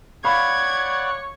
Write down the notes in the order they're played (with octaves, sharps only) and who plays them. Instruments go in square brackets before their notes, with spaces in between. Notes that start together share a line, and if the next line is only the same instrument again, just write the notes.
[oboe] C#5 [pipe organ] D5 F#5 [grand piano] F5 B5 [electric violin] G#6